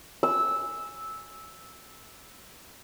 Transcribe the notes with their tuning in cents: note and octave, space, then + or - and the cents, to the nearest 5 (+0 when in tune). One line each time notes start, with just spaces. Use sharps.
E6 -10